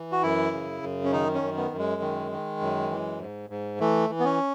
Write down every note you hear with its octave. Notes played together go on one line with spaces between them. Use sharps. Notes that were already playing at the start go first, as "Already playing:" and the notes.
Already playing: E3
F#4
F#2 E4
C#3
F#2
C#4
D#3 D#4
C#4
F#2
B3
F#2
G#3
D#3
D#3
F#2
E3
G#2
G#2
E3 A3
E3
B3
C#4